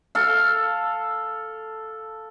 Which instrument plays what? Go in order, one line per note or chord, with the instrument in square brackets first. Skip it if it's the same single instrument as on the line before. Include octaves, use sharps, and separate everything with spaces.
[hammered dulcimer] A4 F5